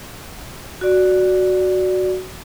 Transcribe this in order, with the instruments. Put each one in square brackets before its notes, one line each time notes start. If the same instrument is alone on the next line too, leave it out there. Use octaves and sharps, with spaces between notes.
[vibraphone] F#4 D5